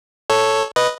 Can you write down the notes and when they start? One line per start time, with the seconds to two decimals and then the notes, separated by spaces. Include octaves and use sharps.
0.30 A4 C#5
0.76 B4 D#5